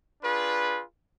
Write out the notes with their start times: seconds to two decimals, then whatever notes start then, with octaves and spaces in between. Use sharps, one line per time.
0.21 D4 F4 G#4 B4